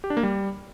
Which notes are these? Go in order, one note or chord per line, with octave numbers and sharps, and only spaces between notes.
G4
D4
A#3
G3